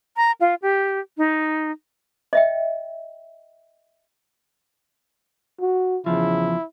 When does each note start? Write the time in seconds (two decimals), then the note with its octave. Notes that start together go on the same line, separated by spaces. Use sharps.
0.17 A#5
0.41 F4
0.62 G4
1.18 D#4
2.33 D#5 E5 G5
5.61 F#4
6.06 E2 C#3 F3 E4